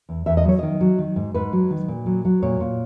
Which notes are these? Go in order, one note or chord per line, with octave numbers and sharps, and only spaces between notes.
E2
E2 E5
D#5
F#3 C#5
D#3 D#5
F#3
D#3
G#2
G#2 B4
F#3
D#3
A#2
F#3
F#3
A#2 C#5
A#2